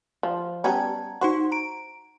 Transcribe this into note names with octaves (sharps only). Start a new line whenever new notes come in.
F3
G3 B3 C#4 A5 A#5 G#6
D#4 F#4 C5 C6 C#6
A#5 D7